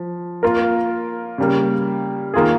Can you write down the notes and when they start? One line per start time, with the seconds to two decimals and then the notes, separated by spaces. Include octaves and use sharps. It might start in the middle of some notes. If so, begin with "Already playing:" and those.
Already playing: F3
0.43 A#3 F4 A#4
1.38 C#3 G3 A#3
2.34 D#3 A#3 F4 G#4